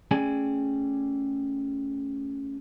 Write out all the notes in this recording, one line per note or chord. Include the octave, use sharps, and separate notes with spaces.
A3 C#4 G#4 D5 G5 G#5